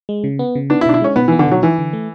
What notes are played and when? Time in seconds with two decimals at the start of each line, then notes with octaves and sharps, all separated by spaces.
0.09 G#3
0.24 C#3
0.39 B3
0.55 C#3
0.70 B3 D4
0.81 E4
0.86 B2 D4
0.94 E4
1.01 G#3 C#4
1.16 B2 B3
1.28 E3
1.32 B3
1.39 D3
1.47 B2 F#3
1.62 E3 E4
1.78 D3
1.93 A3